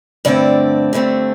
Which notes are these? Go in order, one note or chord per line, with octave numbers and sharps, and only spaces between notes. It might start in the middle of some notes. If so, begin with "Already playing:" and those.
G2 D3 A3 C4 D5
G2 D3 A3 C4